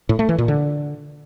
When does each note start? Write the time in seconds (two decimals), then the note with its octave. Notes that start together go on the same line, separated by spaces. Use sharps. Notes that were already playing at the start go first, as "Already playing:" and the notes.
0.09 A2
0.19 A3
0.29 E3
0.38 A#2
0.48 D3